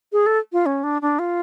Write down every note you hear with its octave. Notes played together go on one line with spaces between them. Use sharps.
G#4
A4
F4
C#4
D4
D4
F4